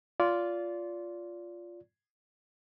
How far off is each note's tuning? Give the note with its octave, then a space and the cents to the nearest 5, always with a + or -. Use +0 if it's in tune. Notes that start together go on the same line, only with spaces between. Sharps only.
F4 +0 D5 -25